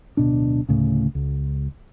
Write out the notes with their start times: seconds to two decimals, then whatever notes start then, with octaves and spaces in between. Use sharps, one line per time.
0.17 D1 B2 D4
0.69 D2 A2 C#3
1.15 C#2